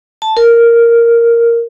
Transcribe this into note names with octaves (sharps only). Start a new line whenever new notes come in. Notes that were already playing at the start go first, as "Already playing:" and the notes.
A5
A#4